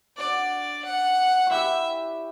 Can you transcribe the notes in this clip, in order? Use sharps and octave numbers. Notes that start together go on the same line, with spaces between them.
D4 F#4 D5
F#5
E4 F#4 G4 E5